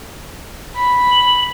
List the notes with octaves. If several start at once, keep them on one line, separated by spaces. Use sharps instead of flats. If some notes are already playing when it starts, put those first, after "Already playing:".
B5
F#7